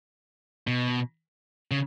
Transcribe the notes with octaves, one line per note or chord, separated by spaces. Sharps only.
B2
C#3